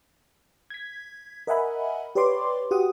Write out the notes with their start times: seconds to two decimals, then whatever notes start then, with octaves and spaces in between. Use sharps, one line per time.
0.70 G#6 B6
1.47 A#4 D#5 E5 F#5 G#5 B5
2.15 G4 B4 C#5 D5 C6 D6
2.71 F#4 G4 F#5 D#6